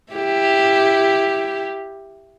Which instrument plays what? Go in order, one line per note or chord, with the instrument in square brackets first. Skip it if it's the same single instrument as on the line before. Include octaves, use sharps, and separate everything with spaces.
[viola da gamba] E4 G4